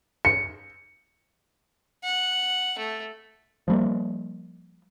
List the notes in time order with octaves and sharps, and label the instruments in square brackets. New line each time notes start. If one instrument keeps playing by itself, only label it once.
[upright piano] C#7
[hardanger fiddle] F#5
A3
[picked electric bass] F3 G3 A#3